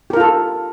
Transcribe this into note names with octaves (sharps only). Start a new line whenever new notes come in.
F4 G4 A4 A#4